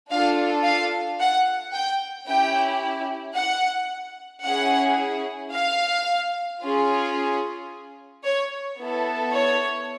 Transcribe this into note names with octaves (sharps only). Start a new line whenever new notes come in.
D4 F4 A4 F5
F5
F#5
G5
C#4 E4 G4 G5
F#5
C#4 E4 G#4 F#5
F5
C#4 F4 G#4
C#5
B3 E4 A4
C#5